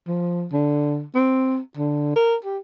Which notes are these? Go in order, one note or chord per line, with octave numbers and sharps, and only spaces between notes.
F3
D3
C4
D3
A#4
G4